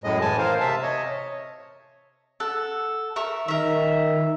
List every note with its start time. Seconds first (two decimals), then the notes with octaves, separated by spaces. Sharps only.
0.04 F#2 A2 G#3 D#5
0.21 A2 E3 G#5 A5
0.38 A#4 C5 F5
0.60 C3 E5 A5
0.83 C#5 D#5
2.40 A4 F#5
3.16 A#4 E5 C#6
3.48 D#3 A#4 E5